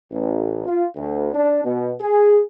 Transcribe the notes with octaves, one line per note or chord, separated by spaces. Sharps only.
A1
F4
D2
D4
B2
G#4